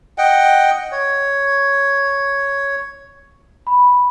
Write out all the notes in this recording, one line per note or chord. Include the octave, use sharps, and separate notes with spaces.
D#5 F#5 G5
C#5
B5